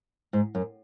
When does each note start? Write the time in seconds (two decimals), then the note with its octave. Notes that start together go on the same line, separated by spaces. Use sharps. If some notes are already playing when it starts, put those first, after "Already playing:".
0.33 G#2
0.55 F#2